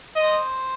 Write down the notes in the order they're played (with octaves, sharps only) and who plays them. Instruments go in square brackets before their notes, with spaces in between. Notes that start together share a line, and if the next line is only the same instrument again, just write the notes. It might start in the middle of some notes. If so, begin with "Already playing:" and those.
[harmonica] C5 [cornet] D#5